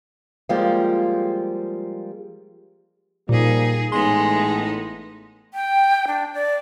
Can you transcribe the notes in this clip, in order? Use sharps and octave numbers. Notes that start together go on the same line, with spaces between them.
F3 G3 G#3 A#3 F4 G4
A#2 F3 G3 A#3 D#4 G#4
A1 A2 G#3 B3 D#4 C6
G5
D4
D5